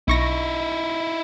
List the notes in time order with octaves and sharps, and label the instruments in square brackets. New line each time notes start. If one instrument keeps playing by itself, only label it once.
[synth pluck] B1 C#6 A#6 [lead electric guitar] D#4 E4